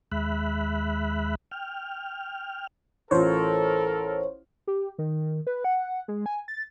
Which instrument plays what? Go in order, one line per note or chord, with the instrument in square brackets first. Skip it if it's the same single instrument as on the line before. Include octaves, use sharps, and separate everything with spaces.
[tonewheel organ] D#2 G#3 E5 B5 F#6
G5 F6
[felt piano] A1 F4 [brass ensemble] A4 A#4 [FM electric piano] C5 C#5
[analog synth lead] G4
D#3
B4
F#5
G#3
G#5
A6